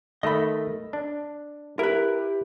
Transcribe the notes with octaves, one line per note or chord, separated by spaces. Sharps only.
D#3 A3 D#5 B5
D4
E4 G4 A#4 B4